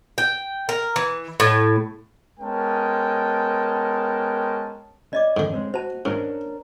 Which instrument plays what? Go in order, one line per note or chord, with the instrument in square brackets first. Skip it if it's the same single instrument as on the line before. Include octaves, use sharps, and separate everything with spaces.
[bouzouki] G5
A#4
E3
A2
[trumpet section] G#3 B3 C#4 A#4 G5 A5
[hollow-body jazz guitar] C#4 [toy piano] D5 D#5 D6
[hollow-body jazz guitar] F2 [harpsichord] G#2 D3
[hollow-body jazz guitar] G#3 C4 C#4
[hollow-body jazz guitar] F#4 [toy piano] C5 A5
[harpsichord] G#2 [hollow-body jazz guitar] C#4 D4 A#4 [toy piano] C5